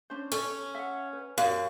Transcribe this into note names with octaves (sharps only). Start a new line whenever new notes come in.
C#4 D4 C5
C#4 A4 C#5
E5 F#5
B4
F#2 C#5 F5